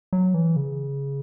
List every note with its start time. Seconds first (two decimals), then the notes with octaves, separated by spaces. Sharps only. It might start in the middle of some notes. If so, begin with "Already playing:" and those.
0.13 F#3
0.34 E3
0.56 C#3